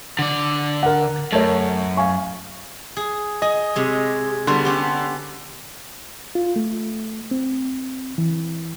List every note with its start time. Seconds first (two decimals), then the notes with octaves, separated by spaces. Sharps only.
0.19 D3 D5
0.83 A#4 F#5
1.32 F#2 A3 A#4 C#5
1.97 F5 G#5 C#6
2.97 G#4
3.42 G#4 D#5
3.75 C3 G#3 C#5
4.47 D3 G3 B3 F#4 C6
4.65 C#4 G4
6.35 F4
6.56 A3
7.31 C4
8.18 E3